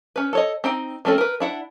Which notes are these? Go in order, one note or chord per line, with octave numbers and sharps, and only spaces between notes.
C#4 B4
A4 C#5 D#5
C4 D#4 G5
F3 A3 C4 C#4 A4
A#4 B4
D4 E4 F#5